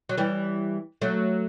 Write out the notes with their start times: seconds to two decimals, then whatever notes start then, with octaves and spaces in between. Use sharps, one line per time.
0.09 F#3
0.17 E3 G3
1.02 F#3 A3